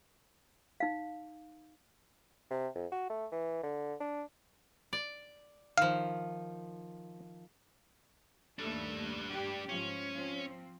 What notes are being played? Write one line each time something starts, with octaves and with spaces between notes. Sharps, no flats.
D#4 F5
C3
F2
F#4
A3
E3
D3
D4
D5
D#3 F3 F5
D#2 G3 A3 D4 A4
G4
G#2 F3 C#4
F3 C4